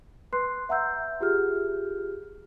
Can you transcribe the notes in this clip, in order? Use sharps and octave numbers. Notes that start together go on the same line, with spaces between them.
B4 C6 F#6 C7
E5 F#5 A#5 E6 G6
F4 G4 G#4 F6